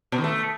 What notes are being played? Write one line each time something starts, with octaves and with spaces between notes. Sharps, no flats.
B2
D#3
A3